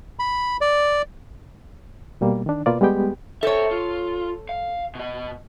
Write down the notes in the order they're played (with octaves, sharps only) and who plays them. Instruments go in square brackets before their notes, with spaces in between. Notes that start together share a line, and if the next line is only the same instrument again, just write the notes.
[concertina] B5
D5
[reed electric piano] B2 G3 A#3
D#3 D4
B2 A#3 F4 B4 D5
G3 G#3 B3 G4 G5
[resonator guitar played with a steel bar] A4 C#5 [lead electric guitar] C5 E5
[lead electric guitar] F4
F5
B2 D#5